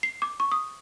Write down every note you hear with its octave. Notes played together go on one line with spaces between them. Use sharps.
C7
D6
C#6
D#6